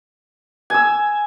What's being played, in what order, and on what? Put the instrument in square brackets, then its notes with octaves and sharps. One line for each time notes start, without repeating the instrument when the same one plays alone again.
[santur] G#5 E6